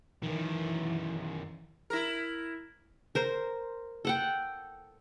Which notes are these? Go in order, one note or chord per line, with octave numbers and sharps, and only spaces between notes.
F#2 D#3 E3
E4 A#4
A#4 C5 A#5
A4 F#5 G5